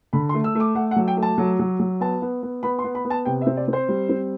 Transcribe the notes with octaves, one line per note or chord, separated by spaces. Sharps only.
D3 B5
C6
A3
E6
A3 D6
A3 F#5
F#5
F#3
G5
A3
A5
F#3
F#3
F#3
B3 A5
B3
B3
B3 B5
C6
B3
B5
B3
A5
C3 G5
E5
C4
D5
C4
C5
G3
C4